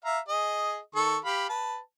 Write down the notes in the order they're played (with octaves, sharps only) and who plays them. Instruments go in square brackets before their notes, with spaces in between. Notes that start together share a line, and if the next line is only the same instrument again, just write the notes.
[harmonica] E5 F5 A#5
G#4 D#5
D#3 A4 C#6
G4 F5 B5
B4 A5